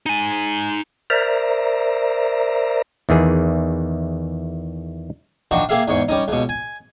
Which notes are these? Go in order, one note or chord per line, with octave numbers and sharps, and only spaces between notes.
D#4 G#5
A#4 C5 D5 E5 A#5
E2 D#3 E3 G#4
D#3 F3 D4 F#4
A#3 G4 G#4 E5 F5
E2 G#2 C#6
G3 C#4 D#4
C#2 B2
G#5